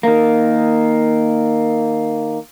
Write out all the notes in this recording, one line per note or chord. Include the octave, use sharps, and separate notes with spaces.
D#3 A#3